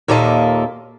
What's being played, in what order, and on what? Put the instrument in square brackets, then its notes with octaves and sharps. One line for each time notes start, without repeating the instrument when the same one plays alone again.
[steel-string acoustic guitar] D#2 A#2 A#3 A4 D#5 E5